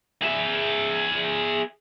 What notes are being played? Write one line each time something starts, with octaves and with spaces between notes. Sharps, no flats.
G#4 E5